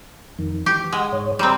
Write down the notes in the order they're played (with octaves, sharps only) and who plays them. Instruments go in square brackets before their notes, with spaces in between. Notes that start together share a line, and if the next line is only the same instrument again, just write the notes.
[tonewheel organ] F2 D#3
[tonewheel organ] E3 [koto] G4
[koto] G#3 [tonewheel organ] F#5 D#6
[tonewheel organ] G#2 C#5
[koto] G3 C4 [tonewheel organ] A#5 C6